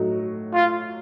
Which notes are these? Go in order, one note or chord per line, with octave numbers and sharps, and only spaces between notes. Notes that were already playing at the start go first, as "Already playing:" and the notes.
Already playing: A2 F#3 A3 D#4 F#4
F4